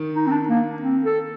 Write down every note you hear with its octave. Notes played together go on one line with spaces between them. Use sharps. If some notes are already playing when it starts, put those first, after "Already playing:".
Already playing: D#3
D#4
C4
D4
A#3
C4
A4